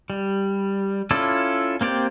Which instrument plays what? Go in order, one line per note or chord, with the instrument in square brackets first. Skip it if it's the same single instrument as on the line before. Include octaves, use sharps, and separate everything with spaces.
[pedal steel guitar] G3
C#4 E4 F4 A4 D5
A#3 C4 G4 D5